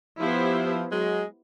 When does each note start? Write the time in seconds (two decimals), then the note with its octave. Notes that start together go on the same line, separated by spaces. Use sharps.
0.20 F3 B3 E4 G4 C5
0.90 F#3 G#3